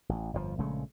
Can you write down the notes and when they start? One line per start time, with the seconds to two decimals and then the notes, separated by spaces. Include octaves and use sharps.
0.09 A1
0.33 G1 F2 B2 F3
0.58 A#1 C#3 G#3 A3